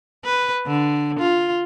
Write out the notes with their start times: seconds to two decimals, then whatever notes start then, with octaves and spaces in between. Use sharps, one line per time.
0.25 B4
0.66 D3
1.19 F4